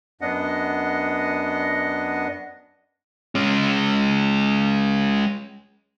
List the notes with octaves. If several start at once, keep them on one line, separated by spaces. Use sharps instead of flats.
F#2 B3 D4 D#5 F#5
G#3 C#4